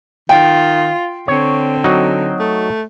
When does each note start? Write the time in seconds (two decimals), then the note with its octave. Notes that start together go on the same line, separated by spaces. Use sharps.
0.29 D#3 F4 G5
1.28 D3 C4 C#5
1.84 F#3 D#4 F#4
2.39 A3